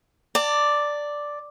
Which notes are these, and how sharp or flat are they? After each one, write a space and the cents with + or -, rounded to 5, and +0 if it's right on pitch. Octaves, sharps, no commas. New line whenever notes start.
D5 +0 A5 +40